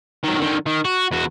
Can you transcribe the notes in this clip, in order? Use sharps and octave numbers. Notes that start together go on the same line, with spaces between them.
D#3 F#3
D3 D#3
D#3
F#4
E2 F#4